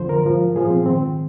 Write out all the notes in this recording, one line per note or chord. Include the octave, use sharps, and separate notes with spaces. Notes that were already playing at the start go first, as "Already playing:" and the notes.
Already playing: F2 D3 F3 C5
A#4
G#2 F3
A#2 F3 G#4
C4
G#2 D#3 C4